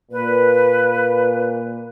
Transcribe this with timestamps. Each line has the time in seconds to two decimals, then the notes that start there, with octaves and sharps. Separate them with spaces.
0.11 A#2 B4